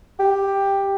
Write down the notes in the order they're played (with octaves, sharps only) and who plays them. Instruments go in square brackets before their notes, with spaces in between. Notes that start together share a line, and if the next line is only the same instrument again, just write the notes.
[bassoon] G4